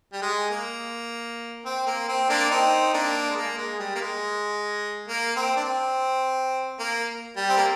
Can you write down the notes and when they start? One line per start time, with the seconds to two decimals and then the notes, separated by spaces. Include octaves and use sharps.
0.13 G3
0.22 G#3
0.50 A#3
1.65 C4
1.86 A#3
2.08 C4
2.29 A#3 D4
2.51 C4 D#4
2.94 A#3 D4
3.30 G#3
3.37 A#3
3.58 G#3
3.79 G3
3.95 A#3
4.01 G#3
5.08 A#3
5.36 C4
5.56 D4
5.64 C4
6.79 A#3
7.36 G3
7.49 C4
7.57 A#3